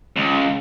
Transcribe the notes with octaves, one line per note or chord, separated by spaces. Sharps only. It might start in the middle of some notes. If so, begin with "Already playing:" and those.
C#2